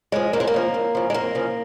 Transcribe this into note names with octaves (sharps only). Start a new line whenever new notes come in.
C#3 F3 G#3
F2 A#3
G#3
A#3
C#3 F3
F2
C#3 F3
G#3
F2 A#3
C#3 F3